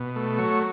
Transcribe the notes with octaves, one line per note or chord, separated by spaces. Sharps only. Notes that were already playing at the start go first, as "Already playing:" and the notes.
Already playing: B2
A3
F#3 C#5